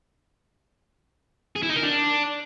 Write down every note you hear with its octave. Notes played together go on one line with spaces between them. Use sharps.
G#4
E4
D#4
A#4
D4